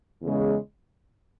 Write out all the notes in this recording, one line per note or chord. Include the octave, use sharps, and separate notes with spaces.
E2 C#3 G#3